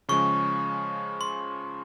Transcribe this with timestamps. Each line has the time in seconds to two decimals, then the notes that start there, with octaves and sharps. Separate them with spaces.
0.09 C#3 F3 G#3 C#4 C#6
1.21 C6